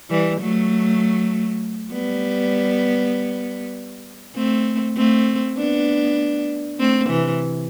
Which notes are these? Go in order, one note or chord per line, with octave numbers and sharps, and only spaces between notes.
E3 G3
F#3 A3
G3 B3
A3 C4
A3 C4
B3 D4
A3 C4
C3 E3